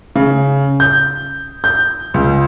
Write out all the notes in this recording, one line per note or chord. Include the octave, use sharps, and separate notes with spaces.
C#3
G6
G6
C#2